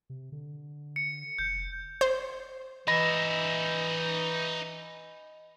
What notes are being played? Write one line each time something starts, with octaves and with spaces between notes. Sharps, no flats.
C3
D3
C#7
F1 G6
C5
E3 D#4 D#5 E5 B5 A#6